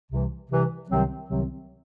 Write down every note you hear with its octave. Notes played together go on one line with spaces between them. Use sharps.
C2 C3 E3
C2 C3 E3
C2 C3 D#3 F#3 C4
C2 C3 D#3 F#3 C4